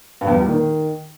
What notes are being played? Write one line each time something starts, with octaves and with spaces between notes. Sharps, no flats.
G2
E2
G3
A#2
D#3